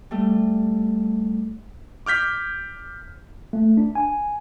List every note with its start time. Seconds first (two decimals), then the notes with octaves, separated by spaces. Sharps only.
0.11 G3 A3
2.06 D6 F6 G6 B6
3.53 A3
3.77 D4
3.95 G#5